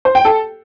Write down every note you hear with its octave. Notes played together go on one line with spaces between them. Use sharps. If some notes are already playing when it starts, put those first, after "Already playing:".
C5
G5
A4